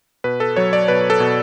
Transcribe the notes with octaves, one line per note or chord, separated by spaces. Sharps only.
B2 B4
A4
F#3 C#5
D5
B2 B4
A4
B2